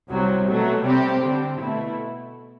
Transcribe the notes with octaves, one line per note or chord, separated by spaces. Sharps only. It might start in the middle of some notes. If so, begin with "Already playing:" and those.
C2 C3 F#3
B2 F#3 A3
C3 G3 C4 G4
D3 G3 C4
B2 A3 E4